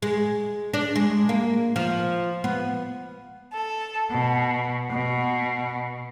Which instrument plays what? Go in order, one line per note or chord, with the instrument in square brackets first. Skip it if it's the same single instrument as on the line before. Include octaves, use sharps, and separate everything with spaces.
[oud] G#3
D4
G#3
A#3
F3
B3
[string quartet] A4
B2
B2